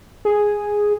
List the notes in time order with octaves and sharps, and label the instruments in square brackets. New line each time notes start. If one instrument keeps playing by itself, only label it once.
[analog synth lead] G#4